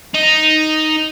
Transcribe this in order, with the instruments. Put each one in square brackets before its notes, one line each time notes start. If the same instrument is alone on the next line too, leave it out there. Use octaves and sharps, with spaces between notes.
[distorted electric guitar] D#4